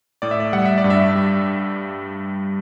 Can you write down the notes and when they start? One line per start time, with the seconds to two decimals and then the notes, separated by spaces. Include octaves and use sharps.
0.22 A2 D5
0.31 E5
0.40 D5
0.53 G3 F#5
0.65 E5
0.78 D5
0.84 G2
0.90 E5
1.15 G3